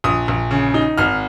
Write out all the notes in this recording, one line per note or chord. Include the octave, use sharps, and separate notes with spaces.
A#1 D#6
A#1
C#3
D#4
G#1 F6